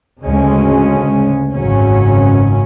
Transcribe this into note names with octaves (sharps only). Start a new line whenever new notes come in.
D2 C#3 G#3 C#4
G#1 F#2 C#3 F#3 C#4